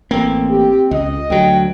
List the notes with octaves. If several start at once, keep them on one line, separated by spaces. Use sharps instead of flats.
A1 A#3 C4
G4
C#2 D#5
D2 F#3 G5